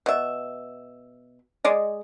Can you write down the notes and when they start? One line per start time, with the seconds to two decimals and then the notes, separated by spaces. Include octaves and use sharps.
0.06 B2 E5
1.64 G#3 D5 D#5